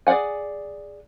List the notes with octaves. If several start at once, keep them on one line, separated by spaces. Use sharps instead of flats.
G#4 D5 E5 F#5 G#5